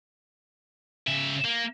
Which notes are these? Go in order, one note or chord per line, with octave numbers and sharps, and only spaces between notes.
C#3 E5
A#3